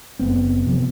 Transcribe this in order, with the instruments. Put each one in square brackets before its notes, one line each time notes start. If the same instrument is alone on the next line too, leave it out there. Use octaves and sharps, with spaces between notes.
[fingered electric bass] F#1 B3 C4
C3 F3 B3